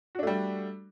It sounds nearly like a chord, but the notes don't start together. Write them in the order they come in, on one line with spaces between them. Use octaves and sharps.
F#4 D4 A3 G3